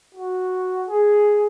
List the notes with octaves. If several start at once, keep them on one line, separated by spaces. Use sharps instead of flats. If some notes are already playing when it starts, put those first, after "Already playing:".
F#4
G#4